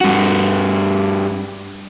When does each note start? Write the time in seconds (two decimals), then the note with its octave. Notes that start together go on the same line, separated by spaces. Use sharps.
0.01 G2 F#4